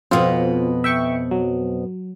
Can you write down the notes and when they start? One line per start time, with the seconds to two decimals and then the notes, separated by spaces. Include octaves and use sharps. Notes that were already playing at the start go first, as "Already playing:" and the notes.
0.11 F2 B2 C4 F4 B4
0.84 E5 G5 C#6
1.31 F#3